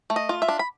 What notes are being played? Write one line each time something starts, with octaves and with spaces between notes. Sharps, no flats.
A3
D#5
F4
E5
D4
B5